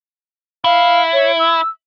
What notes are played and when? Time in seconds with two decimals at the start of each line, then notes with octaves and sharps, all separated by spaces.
0.64 E4 F5
1.13 C#5
1.39 E6